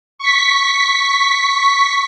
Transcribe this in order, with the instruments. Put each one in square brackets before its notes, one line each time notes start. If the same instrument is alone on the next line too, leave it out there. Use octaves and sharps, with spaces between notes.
[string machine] C#6 B6